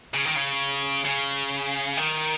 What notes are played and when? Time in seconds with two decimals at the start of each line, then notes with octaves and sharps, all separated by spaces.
0.14 C#3
0.25 D#3
0.35 C#3
1.05 C#3
1.97 D#3